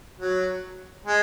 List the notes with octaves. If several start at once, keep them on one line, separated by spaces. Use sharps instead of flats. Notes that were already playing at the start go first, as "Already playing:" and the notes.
F#3
G#3